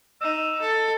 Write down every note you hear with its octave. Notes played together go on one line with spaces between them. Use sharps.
D#4 E6
A4